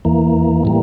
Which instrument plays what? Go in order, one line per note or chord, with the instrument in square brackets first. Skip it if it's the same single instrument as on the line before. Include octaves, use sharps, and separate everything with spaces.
[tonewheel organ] E2 E3 A#3
A2 E3 G3 A#3